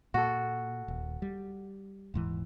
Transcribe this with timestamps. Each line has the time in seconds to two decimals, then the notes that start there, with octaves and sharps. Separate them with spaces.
0.14 A#2 F#4 A4
0.88 D#1
1.22 G3
2.14 D#1 G#2 E3